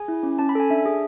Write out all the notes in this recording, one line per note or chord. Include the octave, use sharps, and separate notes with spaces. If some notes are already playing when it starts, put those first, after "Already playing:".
Already playing: G#4 G#5
E4
C#4
C#4 A5
B5
A4 G#5
D4 E5
G#4